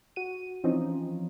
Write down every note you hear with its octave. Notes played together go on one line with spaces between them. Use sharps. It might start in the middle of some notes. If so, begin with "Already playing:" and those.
F#4 D#7
E3 F3 C4 C#4 D#4